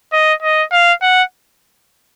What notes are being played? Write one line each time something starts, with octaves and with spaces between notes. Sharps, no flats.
D#5
D#5
F5
F#5